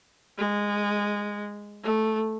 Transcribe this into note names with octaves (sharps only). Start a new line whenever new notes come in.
G#3
A3